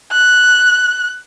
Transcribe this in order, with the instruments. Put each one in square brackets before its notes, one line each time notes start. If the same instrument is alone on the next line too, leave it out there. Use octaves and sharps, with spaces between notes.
[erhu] F#6